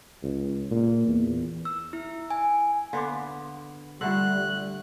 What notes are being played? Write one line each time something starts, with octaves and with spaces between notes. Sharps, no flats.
C#2
A#2
E2
E6
E4
G#5
D3 B3 F5 C6 D6
D3 G3 A3 F4 F#5 E6 F#6